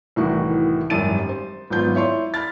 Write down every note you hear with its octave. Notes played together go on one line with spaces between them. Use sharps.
C2 A2 D#3 E3 F#4
G#1 F#2 G3 A6 D#7
C5
G#1 F#3 B3 F4 G6
E4 C#5 D5 C6
B5 F6 A6